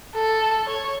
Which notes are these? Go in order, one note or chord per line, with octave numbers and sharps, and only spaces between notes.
A4
C#5